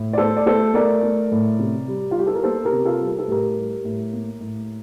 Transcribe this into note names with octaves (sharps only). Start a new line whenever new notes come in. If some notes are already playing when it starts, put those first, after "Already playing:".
Already playing: A2
D5
A3 A4 C5
D5
A3 A4 C5
A3 A#4 D5
A3
A2
C3
G3
F4
G3 G4
A4
A#4
A#3 A4 C5
G4 A#4
C3
F4 A4
G3
A#4
A4
A2 G4 A#4
G3
A2
A#3
A2